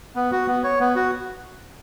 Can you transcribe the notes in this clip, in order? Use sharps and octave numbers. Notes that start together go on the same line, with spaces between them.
B3
F#4
B3
C#5
B3
F#4